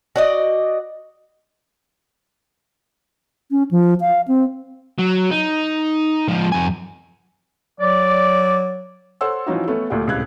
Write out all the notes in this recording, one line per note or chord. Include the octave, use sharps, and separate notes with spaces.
F#4 D5 D#5
C#4
F3
F5
C4
F#3
D#4
F3 G#3
F2 G#5
F#3 D5
A4 C5 C#5 F#5 C6 E6
E3 F3 C#4 D#4 F#4
A3 B3 C#4 A4
D2 A#2 A3 G4 F#5
D#1 C#2 A2 C3 F#6 G#6